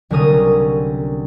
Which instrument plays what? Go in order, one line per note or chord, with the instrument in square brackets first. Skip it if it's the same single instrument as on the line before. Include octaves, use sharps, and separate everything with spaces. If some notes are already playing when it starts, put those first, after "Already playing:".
[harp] C2 D3 F#3 C#4 A#4 D#6